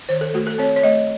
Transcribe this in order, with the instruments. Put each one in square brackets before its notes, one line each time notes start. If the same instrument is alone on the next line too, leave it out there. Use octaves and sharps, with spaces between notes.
[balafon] D#3 C5
A4
A3 F#4
A4
C4 C#5
C#5
A3 D#5